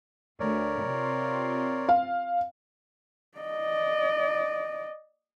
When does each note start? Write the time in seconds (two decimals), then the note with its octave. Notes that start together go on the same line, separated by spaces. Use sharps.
0.40 D2 A#4 C#5 D5
0.84 C3 C4 F4
1.89 F5
3.38 D5 D#5